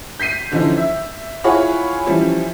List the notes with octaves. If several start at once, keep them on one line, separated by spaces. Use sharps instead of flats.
G6 B6 C7 D#7
D3 E3 F3 C#4 D#4
E5
E4 F4 G#4 C#5 F#5 B5
E3 F3 G3 C#4